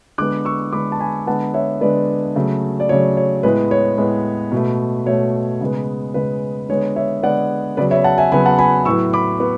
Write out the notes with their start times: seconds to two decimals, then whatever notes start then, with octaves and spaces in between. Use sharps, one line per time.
0.18 D3 G#3 B3 D6 F#6
0.45 C#6 E6
0.73 D3 G#3 B3 B5 D6
0.92 A5
0.99 G#5 B5
1.27 D3 G#3 B3 F#5 A5
1.54 C#5 E5
1.81 D3 G#3 B3 B4 D5
2.35 C#3 F#3 A3
2.80 D5
2.89 C#3 F#3 A3 C#5
3.17 C#5
3.43 A2 G#3 B3 B4
3.71 C#5
3.98 A2 G#3 B3
4.52 B2 A3
5.06 B2 A3 C#5
5.61 C#3 G#3 B3
6.14 C#3 G#3 B3 B4
6.69 D3 G#3 B3 C#5
6.96 C#5 E5
7.23 D3 G#3 B3 D5 F#5
7.77 C#3 F#3 B3 B4 D5
7.91 C#5 E5
8.04 F#5 A5
8.18 E5 G#5
8.32 C#3 F#3 B3 G#5 B5
8.46 F#5 A5
8.59 G#5 B5
8.85 A2 F#3 B3 C#6 E6
9.13 B5 D6
9.40 B3